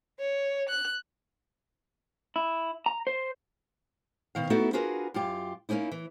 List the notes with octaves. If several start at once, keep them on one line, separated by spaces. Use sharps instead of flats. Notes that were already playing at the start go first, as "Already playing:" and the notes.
C#5
F#6
E4
A#5
C5
B2 D#3 F5
A3 B3 D#4 E4 F#4 A4
D4 F4 F#4 G#4 A#4 B4
F#2 F4 G4
A#3 C4 C#4 D#4 E4
E3